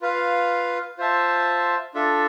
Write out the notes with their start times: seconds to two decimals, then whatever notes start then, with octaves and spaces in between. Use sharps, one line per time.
0.01 F4 B4 F5
0.98 F4 C5 E5 A5
1.94 D4 F4 A4 E5